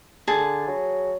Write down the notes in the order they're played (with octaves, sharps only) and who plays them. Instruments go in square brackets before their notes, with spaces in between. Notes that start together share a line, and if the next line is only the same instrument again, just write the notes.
[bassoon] D3 [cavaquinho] G#4 A5
[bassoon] F#3